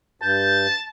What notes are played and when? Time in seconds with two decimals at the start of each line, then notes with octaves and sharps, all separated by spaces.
0.22 G2 A5 G6